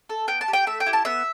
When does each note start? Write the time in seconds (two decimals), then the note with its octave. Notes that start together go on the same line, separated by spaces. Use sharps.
0.10 A4
0.27 B3 G5
0.41 A5
0.48 G4
0.53 G5
0.67 A3 E5
0.80 G5
0.86 E4 G4
0.93 A5
1.05 B3 E5